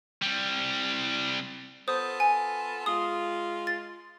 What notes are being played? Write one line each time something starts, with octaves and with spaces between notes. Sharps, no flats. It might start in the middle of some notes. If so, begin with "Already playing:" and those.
C2 G3
B3 F4 A4 C5 D#6
G#5
G#3 F4 D#6
A6